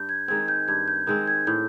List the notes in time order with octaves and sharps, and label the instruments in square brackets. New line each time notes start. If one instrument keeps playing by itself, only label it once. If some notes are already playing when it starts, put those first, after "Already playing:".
Already playing: [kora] G2 [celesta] G6
[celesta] G#6
[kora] D#3 G#3 C4 [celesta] G#6
[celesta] G6
[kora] G2 [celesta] G#6
[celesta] G6
[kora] D#3 G#3 C4 [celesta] G6
[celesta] G#6
[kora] A2 [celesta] G6